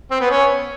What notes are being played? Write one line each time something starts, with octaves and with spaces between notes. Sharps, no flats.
C4
B3
C#4